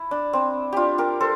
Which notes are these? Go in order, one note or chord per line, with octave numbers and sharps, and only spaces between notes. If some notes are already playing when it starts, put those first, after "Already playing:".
Already playing: E4
D4
C4
D4 F4 G4
G4 A#4
A4 C5